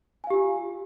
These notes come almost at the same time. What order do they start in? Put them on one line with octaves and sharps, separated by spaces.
G#5 F5 G4 F4